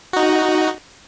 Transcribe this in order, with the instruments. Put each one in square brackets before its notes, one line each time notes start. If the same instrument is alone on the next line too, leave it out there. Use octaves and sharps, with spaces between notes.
[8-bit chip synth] D#4 F#4